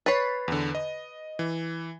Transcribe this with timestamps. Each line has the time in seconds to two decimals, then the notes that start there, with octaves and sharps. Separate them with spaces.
0.06 B4 C#5 A6 B6 C7
0.48 E2 D3
0.75 D#5
1.39 E3